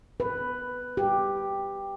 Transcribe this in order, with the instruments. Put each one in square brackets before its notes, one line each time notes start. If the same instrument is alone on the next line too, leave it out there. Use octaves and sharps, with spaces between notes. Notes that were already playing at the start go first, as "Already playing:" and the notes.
[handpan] B4
G4